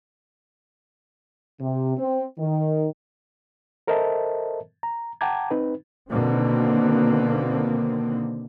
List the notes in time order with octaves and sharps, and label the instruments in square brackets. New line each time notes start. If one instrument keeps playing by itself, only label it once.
[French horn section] C3
C4
D#3
[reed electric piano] A4 A#4 C5 D#5 E5 A5
A#5
F#5 G5 A5 A#5 D6 G#6
C4 D#4 B4
[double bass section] B2 D3 D#3 A#3 C4